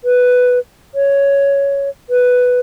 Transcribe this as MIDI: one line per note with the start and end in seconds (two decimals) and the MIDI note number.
0.04 0.59 71
0.94 1.89 73
2.10 2.60 71